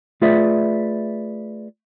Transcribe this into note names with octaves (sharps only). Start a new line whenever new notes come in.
A3 F4 G#4 B4 D5 E5